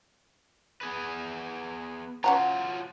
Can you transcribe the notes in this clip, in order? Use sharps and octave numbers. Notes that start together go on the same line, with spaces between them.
B3 G#4 B4
F#3 C#4 F4 F#5 A#5